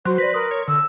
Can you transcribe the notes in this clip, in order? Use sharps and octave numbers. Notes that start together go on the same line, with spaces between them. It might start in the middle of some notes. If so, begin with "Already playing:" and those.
F#3 F#4 C5 C6 F#6
B4 D5 A#6 B6
A#4 C6 D#6
C#5
D3 E6